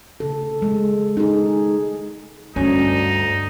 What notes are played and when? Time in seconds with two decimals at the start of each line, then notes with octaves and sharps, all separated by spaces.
0.20 C#3 A4
0.62 G#3
1.17 D#4 G#4
2.56 D2 G2 C#4 D#4